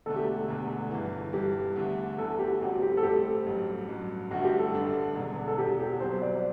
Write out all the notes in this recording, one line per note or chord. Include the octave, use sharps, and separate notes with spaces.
E1 E2 D3 A3 A4
G4
E1 E2 D3 A3
G1 G2 E3
G1 G2 E3 G4
E2 D3 A3
E2 D3 A3 A4
G4
A1 A2 G3 C4 F#4
G4
A4
A1 A2 G3 C4 G4
A1 G2 F#3
A1 G2 F#3
A1 G2 D3 A3 D4 F#4
G4
A4
A1 G2 D3 A3 D4
E1 E2 D3
A4
E1 E2 D3 G4
G4
C2 B2 F#3 C4 C5
D5